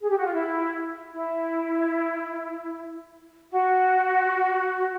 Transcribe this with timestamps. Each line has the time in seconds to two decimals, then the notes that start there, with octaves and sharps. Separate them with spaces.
0.02 G#4
0.10 G4
0.18 F#4
0.26 F4
0.33 E4
1.13 E4
3.51 F#4